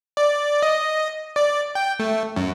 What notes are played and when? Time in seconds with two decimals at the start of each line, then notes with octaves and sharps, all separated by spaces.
0.17 D5
0.63 D#5
1.36 D5
1.75 G5
1.99 A3
2.36 F#2